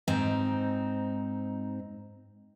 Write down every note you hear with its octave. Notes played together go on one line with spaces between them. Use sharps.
G#2 C4 D#4